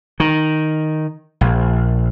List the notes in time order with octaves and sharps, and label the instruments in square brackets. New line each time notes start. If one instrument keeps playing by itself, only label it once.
[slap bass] D#3
A#1